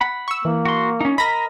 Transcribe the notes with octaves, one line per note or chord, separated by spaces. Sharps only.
F#5 B5
C#6 E6
E3 A#3
F#4 C6
C#4 D#4
A#4 D#5 B5 A#6 B6